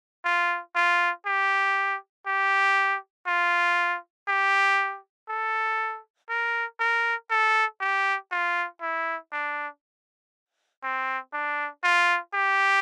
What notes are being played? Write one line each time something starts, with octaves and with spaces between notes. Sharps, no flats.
F4
F4
G4
G4
F4
G4
A4
A#4
A#4
A4
G4
F4
E4
D4
C4
D4
F4
G4